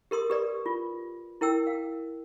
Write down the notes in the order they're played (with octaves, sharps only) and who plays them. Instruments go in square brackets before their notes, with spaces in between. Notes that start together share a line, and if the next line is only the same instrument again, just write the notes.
[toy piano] G4 A#4 C6 D#6
G4 B4 D5
F4
E4 A#4 G5 E6
F5